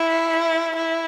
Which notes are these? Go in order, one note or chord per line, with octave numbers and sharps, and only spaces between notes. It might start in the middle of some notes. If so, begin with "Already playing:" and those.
Already playing: E4
E4